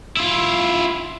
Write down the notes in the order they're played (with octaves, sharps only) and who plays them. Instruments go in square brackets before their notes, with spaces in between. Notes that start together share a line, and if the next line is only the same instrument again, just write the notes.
[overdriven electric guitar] E4 F4